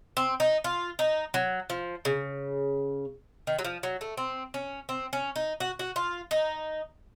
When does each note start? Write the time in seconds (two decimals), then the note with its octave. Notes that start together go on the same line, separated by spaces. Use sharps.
0.17 C4
0.40 D#4
0.64 F4
0.99 D#4
1.34 F#3
1.70 F3
2.05 C#3
3.47 D#3
3.59 F#3
3.64 F3
3.83 F#3
4.01 A3
4.17 C4
4.54 C#4
4.89 C4
5.13 C#4
5.36 D#4
5.60 F#4
5.79 F#4
5.96 F4
6.31 D#4